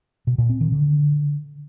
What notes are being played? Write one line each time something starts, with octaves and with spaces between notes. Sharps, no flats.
B2
A#2
C4
D#3
D3